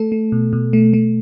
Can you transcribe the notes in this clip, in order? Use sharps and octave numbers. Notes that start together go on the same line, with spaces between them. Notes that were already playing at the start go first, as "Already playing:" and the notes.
Already playing: A3 A4
A3
B2
B2
A3
A3